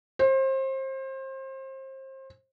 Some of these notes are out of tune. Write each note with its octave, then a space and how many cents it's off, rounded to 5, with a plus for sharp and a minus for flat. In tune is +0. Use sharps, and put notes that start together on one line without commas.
C5 +30